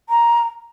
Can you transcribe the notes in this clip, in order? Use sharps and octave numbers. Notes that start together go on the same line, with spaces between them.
A#5